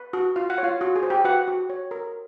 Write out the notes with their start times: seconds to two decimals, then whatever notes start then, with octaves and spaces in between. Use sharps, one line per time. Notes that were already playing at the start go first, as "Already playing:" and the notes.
Already playing: B4
0.13 F#4
0.36 F4 F5
0.50 F#5
0.58 C#5
0.63 F4 F5
0.81 F#4
0.96 G#4 G#5
1.03 C5
1.10 G4 G5
1.24 F#4 B4 F#5
1.48 F#4
1.70 C#5
1.91 A#4